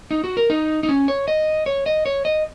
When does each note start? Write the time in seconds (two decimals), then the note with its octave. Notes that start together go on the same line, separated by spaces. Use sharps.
0.11 D#4
0.24 F#4
0.37 A#4
0.50 D#4
0.83 D#4
0.89 C#4
1.08 C#5
1.28 D#5
1.66 C#5
1.86 D#5
2.06 C#5
2.25 D#5